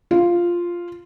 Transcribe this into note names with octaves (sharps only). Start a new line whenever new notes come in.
F4